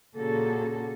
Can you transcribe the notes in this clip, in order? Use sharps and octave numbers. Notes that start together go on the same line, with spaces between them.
A#2 C#3 A#3 F#4 G#4 A4